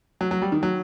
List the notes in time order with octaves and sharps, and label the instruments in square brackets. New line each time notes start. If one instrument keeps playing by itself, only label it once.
[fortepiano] F#3
F#3
G3
D#3
F#3